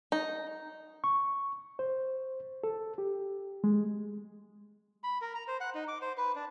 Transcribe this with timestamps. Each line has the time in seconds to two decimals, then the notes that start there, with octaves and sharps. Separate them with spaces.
0.12 D#4
1.04 C#6
1.79 C5
2.64 A4
2.98 G4
3.64 G#3
5.04 B5
5.21 A#4
5.35 A#5
5.48 C5
5.61 F#5
5.75 D#4
5.88 D6
6.02 C5
6.18 B4
6.36 D4